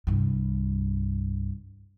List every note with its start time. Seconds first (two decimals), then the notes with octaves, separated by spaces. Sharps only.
0.07 C2 G2